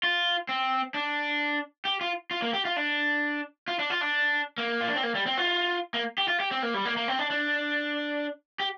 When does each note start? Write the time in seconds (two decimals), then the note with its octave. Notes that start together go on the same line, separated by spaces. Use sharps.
0.03 F4
0.49 C4
0.94 D4
1.85 G4
2.01 F4
2.31 F4
2.42 A#3
2.53 G4
2.65 F4
2.77 D4
3.68 F4
3.79 D4
3.90 F4
4.01 D4
4.58 A#3
4.81 F4
4.88 D4
4.96 C4
5.03 A#3
5.15 G3
5.26 C4
5.37 F4
5.94 A#3
6.18 G4
6.28 F4
6.40 G4
6.51 C4
6.63 A#3
6.74 G3
6.85 A#3
6.97 A#3
7.08 C4
7.19 D4
7.30 D4
8.60 G4